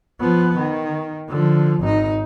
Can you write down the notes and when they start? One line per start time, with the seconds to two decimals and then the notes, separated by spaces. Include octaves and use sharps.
0.20 F3 B3
0.58 D#3
1.29 D3 F3
1.80 G#1 D#4